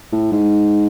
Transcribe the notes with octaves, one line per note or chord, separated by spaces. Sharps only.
A2
G#2